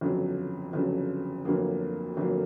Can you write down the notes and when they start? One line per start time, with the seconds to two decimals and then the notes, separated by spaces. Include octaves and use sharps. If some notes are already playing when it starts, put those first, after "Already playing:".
0.01 G1 F2 C#3 F#3
0.73 G1 F2 C#3 F#3
1.45 G1 F2 D3 F#3 A#3
2.17 G1 F2 D3 F#3 A#3